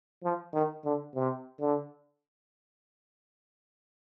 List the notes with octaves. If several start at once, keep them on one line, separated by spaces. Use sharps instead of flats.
F3
D#3
D3
C3
D3